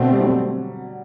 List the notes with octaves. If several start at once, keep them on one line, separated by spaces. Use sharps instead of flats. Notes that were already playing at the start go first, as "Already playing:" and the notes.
Already playing: B2 D3 A3 C4
G3
F#3